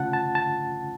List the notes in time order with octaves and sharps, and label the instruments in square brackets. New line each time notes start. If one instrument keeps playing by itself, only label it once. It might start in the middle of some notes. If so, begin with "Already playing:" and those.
Already playing: [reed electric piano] C#3 A3 C#4 F4 F#5 A5
A5
A5